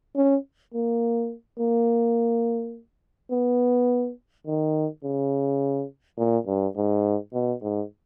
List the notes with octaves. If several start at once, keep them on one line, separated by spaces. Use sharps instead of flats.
C#4
A#3
A#3
B3
D#3
C#3
A#2
G2
G#2
B2
G#2